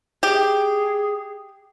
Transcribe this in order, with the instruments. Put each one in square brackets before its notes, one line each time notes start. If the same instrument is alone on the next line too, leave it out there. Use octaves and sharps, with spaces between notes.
[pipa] G4 [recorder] G#4